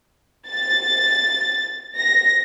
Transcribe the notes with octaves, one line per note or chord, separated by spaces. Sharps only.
A6
A#6